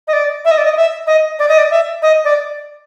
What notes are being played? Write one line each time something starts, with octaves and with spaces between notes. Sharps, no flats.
D#5
D5
E5
D#5
D5
D#5
E5
D#5
D5
D#5
D5
E5
D#5
D5